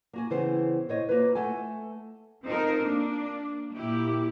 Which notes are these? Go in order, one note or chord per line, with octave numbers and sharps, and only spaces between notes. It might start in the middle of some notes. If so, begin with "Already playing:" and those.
A#3 F#4 G#5
C#3 E3 B3 C4 C5
C5 C#5 D#5
A#3 F4 B4
A3 A4 F#5 G#5
C4 D#4 F4 A4 A#4 C5
A#3 D4
A#2 E4 G4